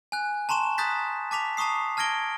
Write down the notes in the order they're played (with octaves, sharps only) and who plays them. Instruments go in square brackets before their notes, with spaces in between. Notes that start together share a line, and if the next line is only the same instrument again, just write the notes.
[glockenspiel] G#5 F#6
A5 A#5 C6 C#6 E7
A#5 D#6 F#6 G6 A6 B6
A5 D6 B6 F7
A5 A#5 C#6 D#6 C7
A5 F6 G#6 A#6 D7 G7